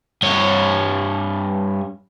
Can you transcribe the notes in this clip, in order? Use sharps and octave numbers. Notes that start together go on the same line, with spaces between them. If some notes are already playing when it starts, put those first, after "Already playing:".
G2 C#5